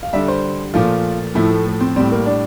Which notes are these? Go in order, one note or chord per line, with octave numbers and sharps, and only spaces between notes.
F5
D3 G3 E5
C5
A#2 F3 A3 F4
A2 F3 A3 E4
A3
A3
C4
A2 G3 C4
A#3
D4